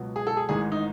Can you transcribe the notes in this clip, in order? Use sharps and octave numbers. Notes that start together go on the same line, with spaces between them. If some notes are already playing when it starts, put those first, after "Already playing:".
Already playing: C#2 B2 F#3
G#4
A4
G#4
A1 G#2 D#3 G#4
D#4